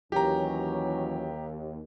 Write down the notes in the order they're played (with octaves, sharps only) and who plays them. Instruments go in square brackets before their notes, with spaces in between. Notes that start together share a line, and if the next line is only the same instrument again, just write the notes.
[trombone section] D#2 [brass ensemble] E3 F#3 C#4 [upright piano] G4 A#5